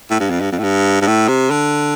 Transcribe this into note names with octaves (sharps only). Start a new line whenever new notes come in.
A2
G2
F2
G2
F2
A2
G2
G2
A2
C3
D3